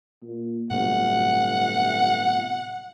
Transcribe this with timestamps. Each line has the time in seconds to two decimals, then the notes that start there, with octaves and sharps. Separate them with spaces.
0.22 A#2
0.71 G1 A2 C3 F#3 F#5